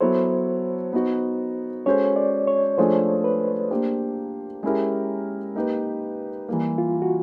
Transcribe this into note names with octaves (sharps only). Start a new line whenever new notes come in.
F#3 B3 E4 A4 C5 C#5
B3 D#4 F#4
G#3 C#4 F#4 A4 C5 C#5
D5
C#5
F3 A3 D4 F4 G#4 C5
B4
A#3 D4 G4 C5
G#3 C#4 E4 G4 A#4
A#3 D#4 G4 B4
E3 G3 A#3
F4
F#4